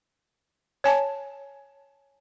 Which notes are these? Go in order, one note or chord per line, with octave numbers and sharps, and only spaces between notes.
C#5 G#5 A5